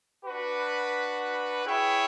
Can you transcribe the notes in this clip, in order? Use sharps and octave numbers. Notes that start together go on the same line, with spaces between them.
D4 F#4 B4
E4 G#4 C#5 E5 G5